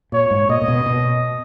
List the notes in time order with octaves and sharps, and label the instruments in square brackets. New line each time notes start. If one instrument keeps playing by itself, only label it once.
[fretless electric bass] A#2 [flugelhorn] C#5
[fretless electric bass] G#2
[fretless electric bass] A#2 [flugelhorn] D#5
[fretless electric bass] A#2
B2
B2